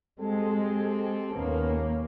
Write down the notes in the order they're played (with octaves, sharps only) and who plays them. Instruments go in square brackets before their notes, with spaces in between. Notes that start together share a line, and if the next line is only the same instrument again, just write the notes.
[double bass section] G#3 [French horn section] C4 G4 A4
[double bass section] D#2 A#3 [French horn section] B3 C#4